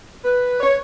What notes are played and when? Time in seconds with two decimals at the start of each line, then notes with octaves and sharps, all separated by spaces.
0.24 B4
0.60 C#5